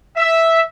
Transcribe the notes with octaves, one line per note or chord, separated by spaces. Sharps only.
E5